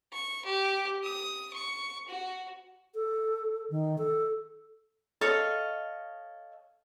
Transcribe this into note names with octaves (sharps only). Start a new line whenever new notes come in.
C#6
G4
D#6
C#6
F#4
A4
D#3
A4
A4 C#5 D#5 F5